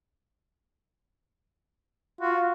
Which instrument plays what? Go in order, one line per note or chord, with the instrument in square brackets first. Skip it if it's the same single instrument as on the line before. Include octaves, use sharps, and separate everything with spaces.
[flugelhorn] F4 [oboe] F#4